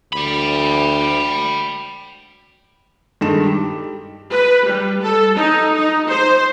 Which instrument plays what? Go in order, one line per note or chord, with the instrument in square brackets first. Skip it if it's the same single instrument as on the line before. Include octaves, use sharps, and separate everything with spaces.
[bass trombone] D2 [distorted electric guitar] G5 B5
[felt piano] G2 D#3 G#3 A4 E7
G4
[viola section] B4
G3
A4
D#4
D#4
C5